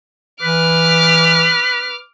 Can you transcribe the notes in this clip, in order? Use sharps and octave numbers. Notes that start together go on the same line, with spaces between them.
E3 B4 D6 F6